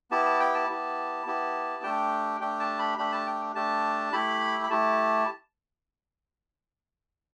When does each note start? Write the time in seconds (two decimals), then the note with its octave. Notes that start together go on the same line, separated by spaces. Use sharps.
0.11 B3 E4 G4 A5
0.26 A5
0.40 G5
0.54 A5
0.68 B3 E4 G4
1.26 B3 E4 G4
1.83 A3 D4 G4 G5
2.41 A3 D4 G4 G5
2.60 A5
2.79 B5
2.98 A3 D4 G4 B5
3.12 A5
3.27 G5
3.55 A3 D4 G4 A5
4.13 A3 E4 G4 B5
4.64 B5
4.70 A3 E4 G4 A5